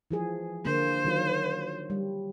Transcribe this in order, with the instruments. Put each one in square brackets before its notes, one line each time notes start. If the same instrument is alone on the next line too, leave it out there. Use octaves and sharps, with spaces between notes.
[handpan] E3 F3 G#4
[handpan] D3 A#3 [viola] C5
[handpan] D#3 F#3 F4
G3